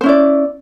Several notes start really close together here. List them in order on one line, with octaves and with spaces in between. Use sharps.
C5 C#4 E4 D5